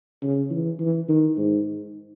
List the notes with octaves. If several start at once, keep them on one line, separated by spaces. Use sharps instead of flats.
C#3
E3
E3
D#3
G#2